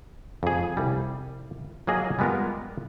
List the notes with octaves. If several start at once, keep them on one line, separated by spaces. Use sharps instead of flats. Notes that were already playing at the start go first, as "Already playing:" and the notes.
F2 G#4
C2 G3
F#3 A#3 G#4 A#4 D#5
G3 G#3 B3 F4 A#4